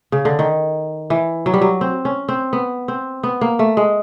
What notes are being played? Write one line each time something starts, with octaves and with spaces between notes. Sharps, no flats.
C#3
D3
D#3
E3
F#3
G3
F#3
C4
C#4
C4
B3
C4
B3
A#3
A3
G#3